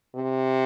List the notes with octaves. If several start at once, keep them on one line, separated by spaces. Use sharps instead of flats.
C3